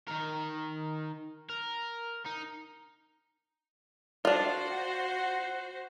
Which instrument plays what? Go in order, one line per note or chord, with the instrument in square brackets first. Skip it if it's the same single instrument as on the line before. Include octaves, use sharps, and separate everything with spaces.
[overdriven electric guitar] D#3 A#4
A#4
D#4
[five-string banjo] D4 F4 [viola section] F#4 C5
[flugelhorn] F#5